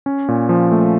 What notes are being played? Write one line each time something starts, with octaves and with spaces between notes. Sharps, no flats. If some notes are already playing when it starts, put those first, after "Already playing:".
C#4
A#2
F3
A3